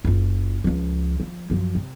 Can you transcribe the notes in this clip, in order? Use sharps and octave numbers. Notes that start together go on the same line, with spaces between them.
F#1 F4
C#2 F3
F3
F#2 F3
C3